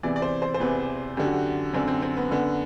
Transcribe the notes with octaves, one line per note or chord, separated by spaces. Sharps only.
E2 C3 E3 D5
D5
C5
C5
C5
E2 C3 E3 B4
F#2 D3 G4
F#4
G4
F#2 D3 C4
C4
C4
B3
F#2 D3 B3